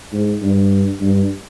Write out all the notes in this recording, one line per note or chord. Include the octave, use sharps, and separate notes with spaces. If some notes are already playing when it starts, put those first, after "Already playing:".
G#2
G2
G2